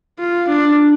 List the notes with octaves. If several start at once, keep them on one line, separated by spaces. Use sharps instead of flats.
F4
D4